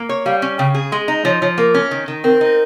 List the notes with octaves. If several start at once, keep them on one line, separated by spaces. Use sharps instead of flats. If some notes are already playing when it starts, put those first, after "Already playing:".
Already playing: A#3
C#5
G3 F5
C#4
C#3 G5
G#4
G#3 C6
D#4 A#5
F3 C#5
F3 C#5
A#3 A#4
C#4
D#3
D#3
C4 A#4
D#4